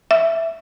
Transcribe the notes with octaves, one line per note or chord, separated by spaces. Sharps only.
E5